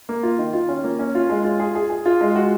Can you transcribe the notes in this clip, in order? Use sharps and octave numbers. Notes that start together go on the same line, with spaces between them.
A#3
F4
D#3
F4
C#4
A#3
C#4
F4
G#3
F4
G#4
G#4
G#4
F4
G#3
F#4